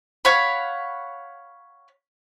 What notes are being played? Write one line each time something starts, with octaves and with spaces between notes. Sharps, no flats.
C#5 F5 F#5 B5